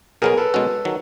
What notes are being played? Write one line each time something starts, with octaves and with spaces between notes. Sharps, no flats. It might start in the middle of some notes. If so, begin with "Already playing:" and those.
B2 F#3 B3 G#4 A#4
A4 B4
B2 G#3 C#4 F#4
D#3 F#3